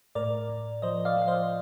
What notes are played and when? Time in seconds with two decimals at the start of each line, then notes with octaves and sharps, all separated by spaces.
0.15 A2 A#4 D5
0.49 A2
0.82 F3 C5 D#5
1.05 D5 F5
1.17 F3
1.22 F5
1.28 C5 D#5